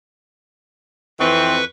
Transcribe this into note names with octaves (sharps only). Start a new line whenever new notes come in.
F2 E3 C4 B4 C#6